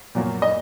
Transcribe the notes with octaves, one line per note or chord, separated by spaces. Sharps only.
A#2 F#3 A#3
D#5